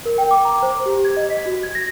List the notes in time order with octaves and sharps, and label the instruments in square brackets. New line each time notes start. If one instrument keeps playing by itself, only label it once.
[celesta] A#4
G5
D6
A#5
C5
G4
G#6
D#5
B6
F#4
G#6
A#6